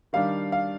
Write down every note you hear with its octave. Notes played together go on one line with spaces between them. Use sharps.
D#3 G3 D4 F5
F5